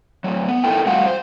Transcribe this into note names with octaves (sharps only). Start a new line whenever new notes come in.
A2 F#3
B3
D#4 E4 A4 A#4 G5
A2 G3 F#4 F5 F#5
C5